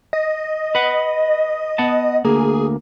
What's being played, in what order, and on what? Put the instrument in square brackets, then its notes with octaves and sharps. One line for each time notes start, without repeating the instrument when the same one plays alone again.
[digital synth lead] D#5
[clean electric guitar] B4 F#5
B3 F#5 A5
[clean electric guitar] D2 A#3 [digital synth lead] G#4